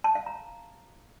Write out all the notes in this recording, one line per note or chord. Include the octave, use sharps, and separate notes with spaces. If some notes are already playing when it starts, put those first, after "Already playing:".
A5
F5
A#5